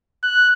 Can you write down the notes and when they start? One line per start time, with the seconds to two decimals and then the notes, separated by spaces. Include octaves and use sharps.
0.23 F#6